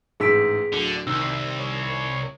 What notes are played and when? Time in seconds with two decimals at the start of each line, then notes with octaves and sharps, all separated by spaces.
0.20 A1 G#2 G#4 E6 B6 D7
0.73 D1 D3
1.07 C2 D#3 E6
1.61 C#5